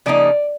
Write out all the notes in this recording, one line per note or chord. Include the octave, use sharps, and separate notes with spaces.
C#3 F3 A#3 D#4 D5